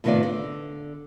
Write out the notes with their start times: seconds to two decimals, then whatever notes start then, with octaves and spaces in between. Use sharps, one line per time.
0.04 A2 C3 D#3 B3 F4 D5
0.23 D3